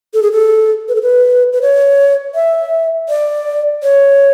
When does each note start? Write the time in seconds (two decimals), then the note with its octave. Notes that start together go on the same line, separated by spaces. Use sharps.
0.14 A4
0.23 G#4
0.32 A4
0.88 B4
0.96 A4
1.02 B4
1.53 B4
1.62 C#5
2.35 E5
3.09 D5
3.83 C#5